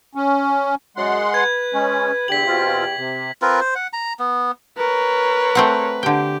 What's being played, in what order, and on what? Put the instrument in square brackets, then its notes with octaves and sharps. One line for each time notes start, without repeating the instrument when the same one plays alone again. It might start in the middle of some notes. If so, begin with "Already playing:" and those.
[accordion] C#4
[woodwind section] F#2 [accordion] G#3 F#5 C6
[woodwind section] B4 [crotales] G#6
[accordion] G#3 C#4
[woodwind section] E2 G4 [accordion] D3 [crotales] B6 F#7
[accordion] B2 C4 F4
C3
[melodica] C4 F4 A#4 B4
C5
F#5
A#5
B3
[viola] A#4 C#5 [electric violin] B4
[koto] A3 C4 F#5
[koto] D3 G5 [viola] G4